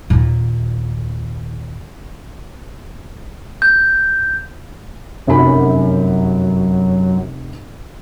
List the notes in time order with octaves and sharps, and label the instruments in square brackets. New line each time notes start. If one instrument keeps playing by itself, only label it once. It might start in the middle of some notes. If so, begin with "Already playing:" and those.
[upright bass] D#2 A#2
[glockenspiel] G6
[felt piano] F1 B5 [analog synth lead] F#2